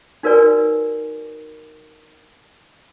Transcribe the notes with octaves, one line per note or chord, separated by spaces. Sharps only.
D#4 F#4 A#4 B4 D5 G#5